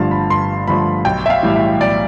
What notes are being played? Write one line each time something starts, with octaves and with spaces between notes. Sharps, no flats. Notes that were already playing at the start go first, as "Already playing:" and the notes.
Already playing: G1 G2 D3 F3 A3 F5 A5 C6
B5
G1 C6
G2 D3 F3 A3 B5
B1 G5
E5
F5
A2 E3 G3
E5
B1 D5